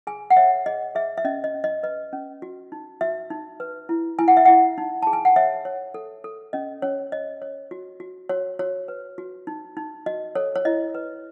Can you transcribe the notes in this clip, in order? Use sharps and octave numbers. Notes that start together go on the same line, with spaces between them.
G#4 G#5
F#5
C#5 E5
G#4 D#5
G#4 E5
E5
C#4 D#5
D#5
C#4
D#5
B4 D#5
C#4
F#4
D#4
F#4 E5
D#4
B4
E4
E4 G#5
F#5
E5
E4 F#5
D#4
G#4 A5
G#5
F#5
C#5 E5
C#5
A4
A4
C#4 D#5
C#4 C#5
C#5 D#5
C#5
F#4
F#4
F#4 C#5
F#4 C#5
B4
F#4
D#4
D#4
F#4 D#5
A4 C#5
C#5
E4 D#5
B4